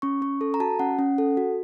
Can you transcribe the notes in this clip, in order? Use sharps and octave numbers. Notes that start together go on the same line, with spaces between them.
C#4 C#6
C#4 C#6
A4
A#5
F#4 A5
C#4 F#5
C#4
A4
F#4